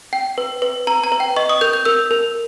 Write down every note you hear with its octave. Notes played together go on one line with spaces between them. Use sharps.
G5
B4
B4
B4 A#5
A#5
B4
G5
D#5 C#6
D#6
A#4 G6
G6
A#4 E6
A#4